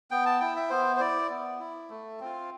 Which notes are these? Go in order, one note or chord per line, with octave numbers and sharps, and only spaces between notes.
B3 G5
A5
E4 G5
E5
B3 C5
C5
E4 D5
B3
E4
A3
C4 F4